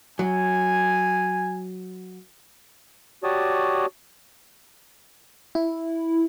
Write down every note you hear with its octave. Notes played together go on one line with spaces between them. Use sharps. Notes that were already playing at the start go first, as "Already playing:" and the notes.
F#3 G#5
F#4 G4 C#5 D5 A5 D#6
E4